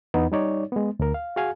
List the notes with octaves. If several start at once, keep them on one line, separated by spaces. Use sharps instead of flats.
E2 B3 D#4
G3 D#4 C#5 D5
G#3 B3
D2 A#4
F5
F#4 G#4 F5 G#5